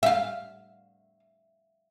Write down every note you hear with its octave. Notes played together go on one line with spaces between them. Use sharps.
E5 F5